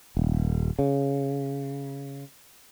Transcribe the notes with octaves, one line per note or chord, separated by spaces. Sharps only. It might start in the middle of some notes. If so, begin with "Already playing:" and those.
D#1
C#3